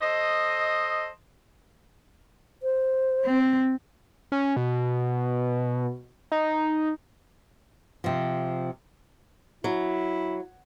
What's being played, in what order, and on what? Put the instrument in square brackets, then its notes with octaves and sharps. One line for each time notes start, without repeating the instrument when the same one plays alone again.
[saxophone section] A4 C5 D#5
[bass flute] C5
[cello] C4
[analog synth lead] C#4
B2
D#4
[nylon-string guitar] C3 F3
[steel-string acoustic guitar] F#3 [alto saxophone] E4